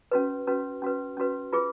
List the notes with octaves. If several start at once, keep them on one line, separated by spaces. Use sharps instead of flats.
C#4 F#4 B4
C#4 F#4 B4
C#4 F#4 B4
C#4 F#4 B4
F4 G#4 B4